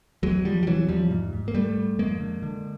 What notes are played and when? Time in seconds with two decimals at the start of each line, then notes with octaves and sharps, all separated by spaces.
0.23 E2 F#3 G#3
0.45 E2 F3 G3
0.63 G3
0.67 C3 E3 F#3
0.88 E2 F3 G3
1.11 G#2
1.33 G#2
1.48 A#3
1.55 G#2 G3 A3
1.77 G#2
1.98 F2 G#3 A#3
2.20 D3
2.43 D3